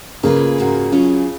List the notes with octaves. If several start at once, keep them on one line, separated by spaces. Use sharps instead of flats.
C#3 A#3 F4 G#4 B4
G#2 F3 A#3 C#4 F#4
F#3 C#4 F4 G#4